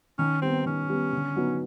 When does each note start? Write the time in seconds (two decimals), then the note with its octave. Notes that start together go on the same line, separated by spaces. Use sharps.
0.18 D#3 C#4
0.42 G3 B3 C4
0.66 D#3 C#4
0.89 G3 B3
1.13 D3
1.36 F#3 B3 D#4